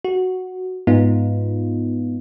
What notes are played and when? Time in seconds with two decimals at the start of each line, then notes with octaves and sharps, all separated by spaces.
0.05 F#4
0.87 G#2 B3 D#4 F4